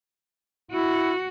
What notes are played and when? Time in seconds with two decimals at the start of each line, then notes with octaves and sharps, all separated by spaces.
0.71 E4 F#4